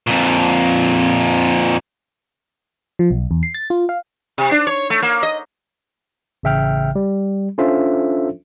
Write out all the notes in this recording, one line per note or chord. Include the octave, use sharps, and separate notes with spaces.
F2 A#2
F3
B1
E2
C7
A6
F4
F5
C3
D4
C#5
A3
A#3
D#5
A1 C#3 E5 G5 F6
G3
C#4 D4 F4 A4 C5 E5